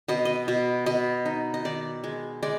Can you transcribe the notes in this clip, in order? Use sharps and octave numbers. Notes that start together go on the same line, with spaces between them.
B2 D#5
D#5
B2
B2 D#5
D#4
D#5
D#3 D5
G#3
G#3 D5